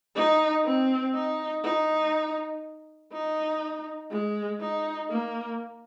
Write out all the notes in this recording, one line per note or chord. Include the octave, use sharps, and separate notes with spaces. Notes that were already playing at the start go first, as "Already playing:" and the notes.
D#4
C4
D#4
D#4
D#4
G#3
D#4
A#3